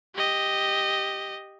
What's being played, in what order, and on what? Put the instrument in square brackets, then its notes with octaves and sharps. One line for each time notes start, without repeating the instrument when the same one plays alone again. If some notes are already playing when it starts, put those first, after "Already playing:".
[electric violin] G4 D#5